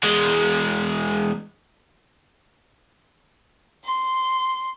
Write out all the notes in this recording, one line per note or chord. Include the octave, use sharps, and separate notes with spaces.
E2 G#3
C6